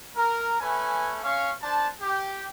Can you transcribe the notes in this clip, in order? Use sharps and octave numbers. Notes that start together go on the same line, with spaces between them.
A#4
A3 C#4 B4 G#5
C#4 F5 C#6
D4 C5 A5
G4